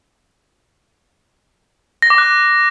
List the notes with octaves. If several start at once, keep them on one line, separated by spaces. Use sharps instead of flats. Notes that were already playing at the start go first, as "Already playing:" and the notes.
A#6
D6
F#6